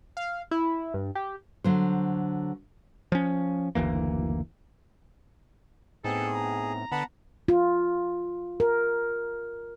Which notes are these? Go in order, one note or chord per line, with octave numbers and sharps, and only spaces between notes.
F5
E4
G2
G4
D3 F#3 C5
F3 C#4
F#1 D2 E3 A#3
A2 B3 C4 D#4 G#4 A4
A#5
D3 B3 F#5 A5 B5
F4
A#4